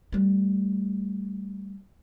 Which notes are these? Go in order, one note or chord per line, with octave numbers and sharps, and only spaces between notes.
G3 A3